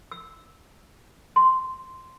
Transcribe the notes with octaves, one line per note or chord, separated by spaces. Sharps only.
E6
C6